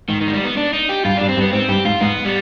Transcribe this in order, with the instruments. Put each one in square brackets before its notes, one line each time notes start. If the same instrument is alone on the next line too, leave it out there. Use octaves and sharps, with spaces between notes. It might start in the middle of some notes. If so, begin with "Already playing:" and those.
[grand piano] G#2 [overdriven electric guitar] D#3
[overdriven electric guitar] D#3
G#3
G3
B3
D4
D#4
G4
[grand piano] G2 [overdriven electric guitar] F4
[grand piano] G2 [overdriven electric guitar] D4
[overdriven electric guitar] C4
[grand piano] G2
[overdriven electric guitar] B3
[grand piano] G#2 [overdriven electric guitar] C4
[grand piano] G2 [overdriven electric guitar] G4
[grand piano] G#2 [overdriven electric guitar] F4
[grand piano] G#2 [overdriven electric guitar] B3
[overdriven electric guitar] G3